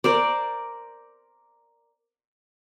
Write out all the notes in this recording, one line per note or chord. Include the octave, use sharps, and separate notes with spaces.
A#4 C5 D5